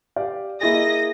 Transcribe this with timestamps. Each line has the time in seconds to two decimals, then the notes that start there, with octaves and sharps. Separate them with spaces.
0.16 G4 D5 F5
0.61 A#3 E4 G#4 D#5 D#6 A#6